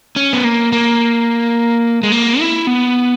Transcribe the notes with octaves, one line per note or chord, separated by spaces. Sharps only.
C#4
B3
A#3
A#3
G#3
A#3
E4
B3